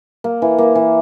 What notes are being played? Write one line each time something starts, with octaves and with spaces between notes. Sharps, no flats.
A#3
E3
A#3
E3